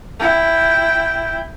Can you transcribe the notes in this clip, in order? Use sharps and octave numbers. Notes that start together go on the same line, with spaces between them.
E4 G5